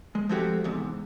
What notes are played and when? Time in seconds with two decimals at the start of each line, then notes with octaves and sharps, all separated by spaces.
0.15 G#3
0.29 F3 G#3 A3 C4 F#4 G4
0.64 E2 G#2 C3